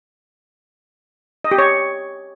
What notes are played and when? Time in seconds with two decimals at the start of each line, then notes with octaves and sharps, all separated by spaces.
1.44 D#5
1.51 G4
1.58 C#5